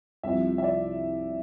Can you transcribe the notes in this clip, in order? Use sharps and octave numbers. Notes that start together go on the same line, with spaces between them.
C2 C3 F3 E5
E5
D5